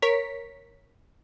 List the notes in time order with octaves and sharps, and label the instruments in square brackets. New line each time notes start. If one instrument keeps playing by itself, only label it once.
[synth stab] A#4 C#5 B6